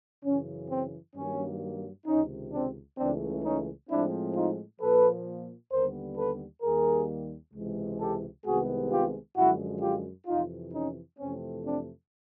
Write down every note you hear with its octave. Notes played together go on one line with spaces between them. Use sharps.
F#2 C#3 E3 C#4
C4
G2 D#3 F#3 A#3 C#4
C#2 C3 D#3 C#4 D#4
C4 D4
C#2 C#3 E3 A3 C4 D4
C#4 D#4
A2 F3 G#3 C4 D4 E4
D#4 F4
A#2 F3 A#3 A4 B4
D#2 D3 G3 B3 A#4 C5
A4 B4
D#2 D#3 G3 A#3 G#4 A#4
C#2 C3 E3 G#3
G4 A4
C2 C3 D#3 G#3 B3 F#4 G#4
F4 G4
F#2 D3 F3 G#3 E4 F#4
F4 G4
F2 C3 E3 D#4 F4
C#4 D#4
F2 C3 E3 A3 C4 C#4
C4 D4